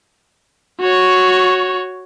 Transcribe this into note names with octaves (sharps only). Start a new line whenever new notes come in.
F#4 C#5